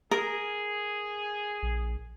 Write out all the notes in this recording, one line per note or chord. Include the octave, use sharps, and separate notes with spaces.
G#4 A#4
A#1